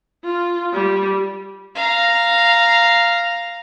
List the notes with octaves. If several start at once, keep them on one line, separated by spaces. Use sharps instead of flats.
F4
G3
F5 A#5